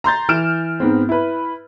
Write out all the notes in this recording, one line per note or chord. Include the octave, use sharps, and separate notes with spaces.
A#5 C6 G6 A6
E3 F6 D7 E7
G#2 B3 C4
E4 B4